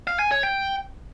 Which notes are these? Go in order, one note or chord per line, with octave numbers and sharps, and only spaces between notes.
F5
G#5
C#5
G5